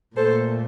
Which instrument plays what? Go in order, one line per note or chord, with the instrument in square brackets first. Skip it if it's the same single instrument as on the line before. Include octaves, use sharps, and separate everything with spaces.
[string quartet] A#2 A3 A4 C5